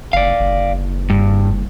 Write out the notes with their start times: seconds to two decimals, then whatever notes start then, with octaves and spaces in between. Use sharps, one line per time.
0.13 F#1 D5 F5
0.40 F#1
1.10 G2